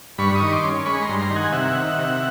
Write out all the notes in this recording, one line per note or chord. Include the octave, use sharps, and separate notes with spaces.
G2 B5 C#6
C#6 D#6
D#3
C6 D6
C#4
G#3 B5 C#6
A#5 C6
G2
A#5 C6
D#3
F#5 G#5
C3 E5 F#5
D#3
C3